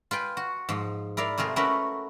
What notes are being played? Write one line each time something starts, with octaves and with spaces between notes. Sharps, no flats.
F4 B4 G5 G#5
F#4
G#2 F3
E4 A#4 D5 F5
C3 A3 F4 G#4 A#4
A3 C#4 E4 F#4 A#4 B4